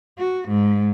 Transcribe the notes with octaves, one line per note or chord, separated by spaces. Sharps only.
F#4
G#2